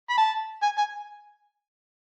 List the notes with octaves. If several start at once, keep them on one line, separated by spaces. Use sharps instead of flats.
B5
A5
G#5
G#5